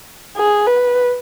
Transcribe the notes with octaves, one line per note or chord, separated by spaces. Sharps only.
G#4
B4